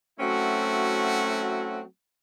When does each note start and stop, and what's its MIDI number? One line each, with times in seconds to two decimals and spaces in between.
0.20 1.81 54
0.20 1.81 57
0.20 1.81 60
0.20 1.81 61
0.20 1.81 64
0.20 1.81 66